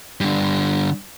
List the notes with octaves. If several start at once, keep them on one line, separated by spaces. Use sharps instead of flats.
G2 D3